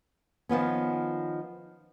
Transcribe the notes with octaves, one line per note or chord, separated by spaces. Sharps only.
D#3 F3 B3 C#4